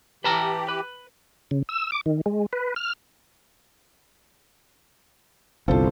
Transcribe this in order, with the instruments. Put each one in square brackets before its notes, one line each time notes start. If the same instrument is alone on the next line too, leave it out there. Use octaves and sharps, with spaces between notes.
[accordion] E3 G4 [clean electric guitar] B4 A5 A#5
[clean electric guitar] B4
[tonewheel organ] C#3
E6
D6
D#3
G#3
B4
F6
[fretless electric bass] G1 C2 [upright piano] F4 A4 C5